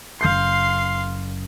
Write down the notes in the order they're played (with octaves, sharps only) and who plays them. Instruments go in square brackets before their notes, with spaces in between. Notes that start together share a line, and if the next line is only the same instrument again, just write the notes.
[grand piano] F#1 G6 C7 [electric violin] F5 C6